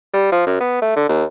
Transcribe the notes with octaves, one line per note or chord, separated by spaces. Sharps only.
G3
F3
F#2
B3
A3
D3
D#2